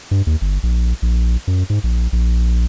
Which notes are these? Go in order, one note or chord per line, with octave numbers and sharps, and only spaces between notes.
G2
D#2
G1
A#1
A#1
F#2
G#2
A#1
A#1